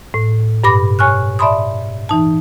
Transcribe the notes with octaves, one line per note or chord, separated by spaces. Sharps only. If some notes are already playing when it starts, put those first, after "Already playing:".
A2
G2 B2 B5 D6 A#6
C#5 G#5 C#6 F6 F#6
D5 E5 A5 B5 C6 D#6
E3 D#4 A5